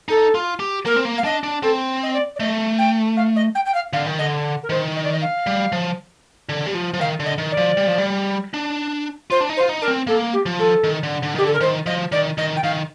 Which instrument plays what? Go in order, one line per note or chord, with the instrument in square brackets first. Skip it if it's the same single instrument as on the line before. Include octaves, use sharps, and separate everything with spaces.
[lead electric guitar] D#4 [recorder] A4
[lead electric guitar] F4
G4
[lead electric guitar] A#3 [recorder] A#4
[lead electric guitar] C4
A#3
[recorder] F5
[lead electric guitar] D4 [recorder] D#5
[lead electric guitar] D4
[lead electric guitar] C4 [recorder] A4
[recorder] D#5
D5
D5
[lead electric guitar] A3 [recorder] D#5
[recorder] G5
F5
D#5
G5
G5
F5
[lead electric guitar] D3 [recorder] F5
[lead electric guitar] D#3
[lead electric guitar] D3 [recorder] D#5
[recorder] A#4
[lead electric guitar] D#3 [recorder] C5
[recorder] D#5
D5
D#5
F5
[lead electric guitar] G3
F3
D3
G3
F3
F3
[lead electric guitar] D#3 [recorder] F5
[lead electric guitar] D3
[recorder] D#5
[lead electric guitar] D#3
[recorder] D5
[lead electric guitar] F3
G3
F3
G3
D4
[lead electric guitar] F4 [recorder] C5
[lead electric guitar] D4
D#4
[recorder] C5
[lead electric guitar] F4
D#4
[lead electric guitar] D4 [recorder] A#4
[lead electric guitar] C4
[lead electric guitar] A#3 [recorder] A4
[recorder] G4
[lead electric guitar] F3
[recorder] A4
[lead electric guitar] D#3
D3
D3
D#3
[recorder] G4
[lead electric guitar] D3 [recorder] A4
[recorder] A#4
[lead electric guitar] D#3 [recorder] C5
[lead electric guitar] F3 [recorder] D#5
[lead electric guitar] D#3 [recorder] D5
[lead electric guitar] D#3 [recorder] D#5
[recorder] G5
[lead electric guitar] D#3 [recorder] F5